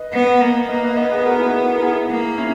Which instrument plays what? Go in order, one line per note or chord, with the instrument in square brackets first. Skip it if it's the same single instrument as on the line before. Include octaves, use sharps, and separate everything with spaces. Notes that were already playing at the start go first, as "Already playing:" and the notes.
Already playing: [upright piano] B4 D#5
[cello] B3
A#3
[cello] A#3 [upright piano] B4 D#5
[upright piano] B4 D#5
[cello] B3 [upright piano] B4 D#5
[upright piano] G#4 B4
F#4 A#4
E4 G#4
A#4
E4 G#4
[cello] A#3
[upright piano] C#4 E4